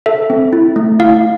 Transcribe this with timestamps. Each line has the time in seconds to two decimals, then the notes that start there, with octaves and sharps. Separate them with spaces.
0.06 A4 E5
0.30 C4
0.53 E4
0.76 A3
0.99 E4 F5